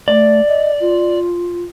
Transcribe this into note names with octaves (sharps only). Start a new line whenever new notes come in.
A3 D5
D#5
F4